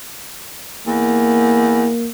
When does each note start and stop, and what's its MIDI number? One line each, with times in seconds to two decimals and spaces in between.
0.87 1.88 40
0.87 2.10 58